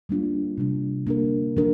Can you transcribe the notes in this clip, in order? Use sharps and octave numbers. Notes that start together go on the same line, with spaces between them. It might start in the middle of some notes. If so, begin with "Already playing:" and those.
G3 A#3 D4 F4
C3 G3 D4
A#3 D4 A#4
F3 D4 A#4